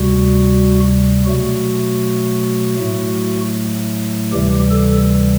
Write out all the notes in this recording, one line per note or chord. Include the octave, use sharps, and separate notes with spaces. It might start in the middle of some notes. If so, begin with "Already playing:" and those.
Already playing: D2 C3 G3 F#4
B2 F#3 A3 F#4
A2 F#3 A3
D2 C3 E3 G3 G4
A4